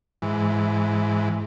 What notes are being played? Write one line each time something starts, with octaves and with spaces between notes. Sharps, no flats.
G#2 E3